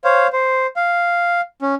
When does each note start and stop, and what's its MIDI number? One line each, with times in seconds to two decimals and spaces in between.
0.04 0.27 72
0.04 0.27 73
0.04 0.27 77
0.33 0.67 72
0.76 1.41 77
1.62 1.75 61